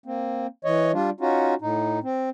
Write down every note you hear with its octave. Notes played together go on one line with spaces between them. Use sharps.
A#3 C4
E3 C#5 D#5
G3 D4 F4
C#4 D#4 F4 F#4
A2 D#4
C4